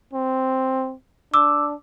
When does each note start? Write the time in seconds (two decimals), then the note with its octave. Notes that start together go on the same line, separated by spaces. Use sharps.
0.13 C4
1.34 D4 D6 E6